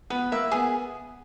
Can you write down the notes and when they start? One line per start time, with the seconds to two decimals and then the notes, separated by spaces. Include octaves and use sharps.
0.10 B3 B4
0.32 A#3 E5
0.52 B3 G#4